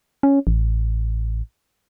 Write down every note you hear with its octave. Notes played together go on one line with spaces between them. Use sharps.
C#4
A1